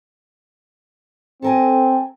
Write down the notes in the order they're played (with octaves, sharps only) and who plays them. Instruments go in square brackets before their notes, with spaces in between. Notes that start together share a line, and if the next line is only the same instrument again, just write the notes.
[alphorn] C4 [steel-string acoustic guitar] A4 A#4 G#5